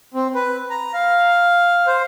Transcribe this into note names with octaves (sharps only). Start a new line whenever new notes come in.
C4
B4
A#5
F5
C5